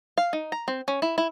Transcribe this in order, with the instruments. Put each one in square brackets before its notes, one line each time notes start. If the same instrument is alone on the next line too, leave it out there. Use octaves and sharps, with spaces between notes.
[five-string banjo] F5
D#4
A#5
C4
C#4
E4
E4